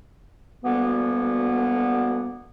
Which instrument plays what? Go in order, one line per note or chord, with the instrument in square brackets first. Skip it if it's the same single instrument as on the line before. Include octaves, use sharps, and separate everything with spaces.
[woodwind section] D2 B2 G3 A#3 B3